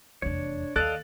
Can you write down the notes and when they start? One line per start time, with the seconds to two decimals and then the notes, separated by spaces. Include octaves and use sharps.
0.22 F1 E2 D4 C#5
0.76 D#2 A4 D5 D#5 F5 F#6 A6